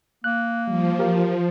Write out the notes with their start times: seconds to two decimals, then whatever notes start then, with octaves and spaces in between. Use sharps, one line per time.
0.24 A#3 F#6
0.68 F3 G3
0.99 G4 A#4 F5